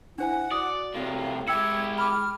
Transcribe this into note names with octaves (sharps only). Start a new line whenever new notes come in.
D4 E4 C5 F#5 G#5
F#4 D5 D#6
A2 C3 F5
G#3 E4 G4 G5 E6 G#6 C#7
B5 D6 F6